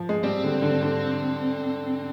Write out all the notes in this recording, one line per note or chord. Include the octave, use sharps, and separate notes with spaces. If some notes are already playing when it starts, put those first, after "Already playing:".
Already playing: F3
G#3
G3 C4
D3
D3
D3